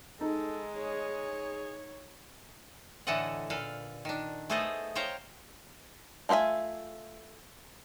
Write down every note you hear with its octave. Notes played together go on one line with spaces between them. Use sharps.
G#3 D#4 A4
G#4 C#5
A2 D3 E3 A4 D#5 F#5
A#2 A4 B4 F5
D#3 D4
A3 B3 G#4 A4 C5 D#5
C5 C#5 F5 G5 A#5
A3 F4 C5 E5 G#5